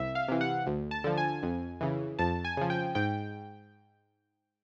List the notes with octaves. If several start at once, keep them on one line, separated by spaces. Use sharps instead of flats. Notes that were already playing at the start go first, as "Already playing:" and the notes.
Already playing: C2 E5
F5
C3 E3
F#5
D2
A5
D3 F3
G#5
F2
C#3 E3
F2 A5
G#5
C#3 F3
G5
G#2 G5